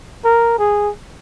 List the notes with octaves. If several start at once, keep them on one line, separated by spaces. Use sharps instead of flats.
A#4
G#4